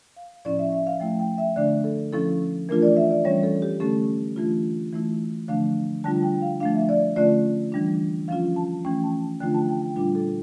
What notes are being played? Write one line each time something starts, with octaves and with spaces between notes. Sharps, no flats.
F5
A2 F3 C#4 E4 D5
E5
E5
F5
F3 A3 E4 G5
G5
E5
D3 A3 D4 D5
A4
F3 C#4 E4 A4
E3 A3 D4 F4 A#4
D5
E5
D5
E3 G3 C#4 C#5
A4
A4
G4
D3 A3 C#4 A4
E3 A3 D4 F4
E3 A3 E4
D3 F3 A3 D4 F5
D3 G3 D4 F4 A5
G5
F5
F3 A3 D4 F5
E5
D5
D3 A3 C#4 F4 D5
E3 G3 D4
F3 C#4 F4 F5
A5
E3 A3 C#4 G5
A5
A5
D3 F3 A3 D4 F4 G5
A5
G5
G5
A#2 G3 D4 F4
A4